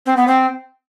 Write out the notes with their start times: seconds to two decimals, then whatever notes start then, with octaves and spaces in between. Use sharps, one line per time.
0.06 C4
0.17 B3
0.27 C4